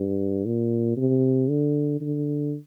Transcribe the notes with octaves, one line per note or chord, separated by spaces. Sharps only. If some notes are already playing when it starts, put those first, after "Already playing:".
Already playing: G2
A#2
C3
D3
D3